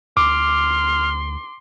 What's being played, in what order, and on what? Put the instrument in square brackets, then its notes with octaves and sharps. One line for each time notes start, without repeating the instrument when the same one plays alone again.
[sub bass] D2 [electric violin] C6 [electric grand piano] D6 [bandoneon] F6